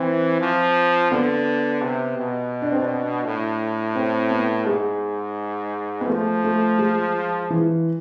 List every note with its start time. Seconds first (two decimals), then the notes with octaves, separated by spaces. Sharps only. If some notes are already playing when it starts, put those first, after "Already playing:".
Already playing: E3 C4
0.40 F3
1.11 D3 B3
1.82 C3
2.18 B2
2.62 D4
2.72 C4
2.81 D4
3.25 A2
3.95 C4
4.31 B3
4.66 G#2 G#3
6.01 B3
6.08 F3 A3
6.44 A3
6.79 G#3
7.50 E3